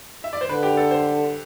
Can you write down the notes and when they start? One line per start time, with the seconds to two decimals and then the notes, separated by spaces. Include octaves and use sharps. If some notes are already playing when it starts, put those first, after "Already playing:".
0.24 E5
0.33 D5
0.41 C5
0.49 D3 B4
0.63 G4
0.77 A4
0.91 C5